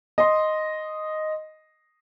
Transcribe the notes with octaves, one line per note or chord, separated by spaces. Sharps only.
D#5 C6